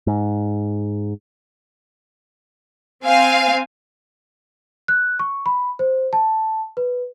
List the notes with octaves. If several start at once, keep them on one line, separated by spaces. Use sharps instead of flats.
G#2
C4 F5 G#5
F#6
C#6
B5
C5
A5
B4